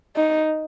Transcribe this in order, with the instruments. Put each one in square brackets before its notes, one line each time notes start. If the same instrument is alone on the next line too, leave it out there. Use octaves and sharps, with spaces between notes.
[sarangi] D#4